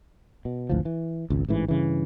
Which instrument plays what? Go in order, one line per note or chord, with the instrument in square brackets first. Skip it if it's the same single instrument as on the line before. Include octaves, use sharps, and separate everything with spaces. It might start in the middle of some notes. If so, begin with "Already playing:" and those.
[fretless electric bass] B2
G#1 D2 E3 F3
E3
G#1 C#2
A1 G#2 E3
G2 C#3 E3